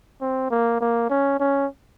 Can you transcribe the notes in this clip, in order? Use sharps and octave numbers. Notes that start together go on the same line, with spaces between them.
C4
A#3
A#3
C#4
C#4